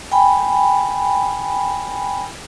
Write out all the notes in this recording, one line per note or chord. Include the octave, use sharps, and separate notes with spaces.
G5 G#5 B5